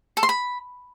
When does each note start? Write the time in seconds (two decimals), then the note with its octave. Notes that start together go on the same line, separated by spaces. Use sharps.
0.17 A4
0.23 C6
0.29 B5